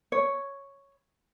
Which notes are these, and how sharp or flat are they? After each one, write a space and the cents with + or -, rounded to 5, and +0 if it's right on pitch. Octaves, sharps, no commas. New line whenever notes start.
C#5 +0